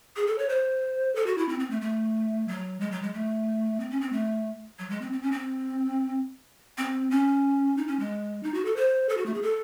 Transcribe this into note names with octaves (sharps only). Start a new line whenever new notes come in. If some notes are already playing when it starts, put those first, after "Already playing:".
G#4
A4
C#5
C5
A4
F#4
E4
C4
C4
A3
A3
F#3
G#3
F#3
G#3
A3
C4
C#4
C4
A3
F#3
G#3
C4
C4
C#4
C4
C4
C#4
D#4
C#4
G#3
D#4
F#4
A4
C5
A4
F#4
A3
G#4
A4